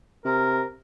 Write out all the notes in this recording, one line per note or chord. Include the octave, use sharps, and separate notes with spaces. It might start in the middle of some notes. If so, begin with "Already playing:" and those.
C3 A#4